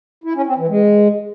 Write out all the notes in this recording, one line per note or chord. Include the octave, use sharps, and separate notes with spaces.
E4
C#4
C4
E3
G#3